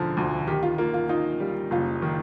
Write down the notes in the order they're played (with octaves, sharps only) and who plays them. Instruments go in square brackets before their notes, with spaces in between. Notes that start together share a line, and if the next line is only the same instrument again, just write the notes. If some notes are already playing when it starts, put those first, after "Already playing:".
Already playing: [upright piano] E1 D3 F3
D2
[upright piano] D#3 [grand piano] G4
[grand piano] F4
[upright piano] A#3 [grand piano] F4
[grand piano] F4
[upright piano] D#4 [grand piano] F4
[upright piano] G3
[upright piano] F#1 [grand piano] F4
[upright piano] D#3